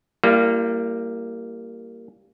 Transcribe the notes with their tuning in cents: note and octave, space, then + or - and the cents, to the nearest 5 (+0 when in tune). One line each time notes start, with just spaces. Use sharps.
G3 +0 A#3 -15 E4 +40